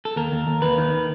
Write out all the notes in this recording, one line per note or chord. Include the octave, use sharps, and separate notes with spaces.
A4
D#2 A#4
D#2
D#2
D#2 B4
D#3